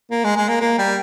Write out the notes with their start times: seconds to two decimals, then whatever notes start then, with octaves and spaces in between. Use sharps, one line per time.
0.11 A#3
0.24 G#3
0.37 G#3
0.48 A#3
0.61 A#3
0.78 G3